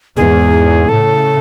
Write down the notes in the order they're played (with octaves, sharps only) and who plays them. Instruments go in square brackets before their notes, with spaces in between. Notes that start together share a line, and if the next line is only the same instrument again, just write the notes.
[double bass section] E2 G#2 [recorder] G#4
[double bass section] A2 C#3 [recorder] A4